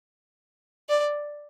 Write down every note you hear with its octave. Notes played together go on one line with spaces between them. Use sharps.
D5